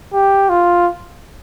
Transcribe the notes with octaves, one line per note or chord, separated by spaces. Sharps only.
G4
F4